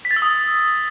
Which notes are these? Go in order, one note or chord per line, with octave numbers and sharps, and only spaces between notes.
B6
A6
E6
D#6